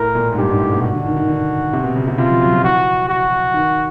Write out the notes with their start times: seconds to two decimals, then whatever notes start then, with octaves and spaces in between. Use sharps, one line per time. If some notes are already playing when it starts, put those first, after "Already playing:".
Already playing: A2 A#4
0.15 A#2
0.32 G#2
0.38 G2 G4
0.49 G#2
0.60 A2
0.72 B2
0.82 F#4
0.93 D3
1.05 D#3
1.17 D#3
1.28 D3
1.73 C3
1.84 B2
1.96 C#3
2.07 C3
2.18 C3 F4
2.30 F3
2.41 F#3
2.53 F3
2.63 E3 F#4
3.09 F#4
3.54 D#3